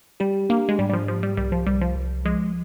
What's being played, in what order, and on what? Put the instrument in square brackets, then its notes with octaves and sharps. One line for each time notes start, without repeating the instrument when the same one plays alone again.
[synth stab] G3 [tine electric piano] G4
[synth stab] A#3 [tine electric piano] D4
[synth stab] G#3
[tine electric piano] G#2 [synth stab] G3
[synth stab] G3
F3
[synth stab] F3 [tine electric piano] G4
[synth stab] G3
[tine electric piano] C2 [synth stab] G3
[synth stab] F3
[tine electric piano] C2 [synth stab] G3
[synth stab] F3
[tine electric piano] C2
[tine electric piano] F3 [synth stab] G#3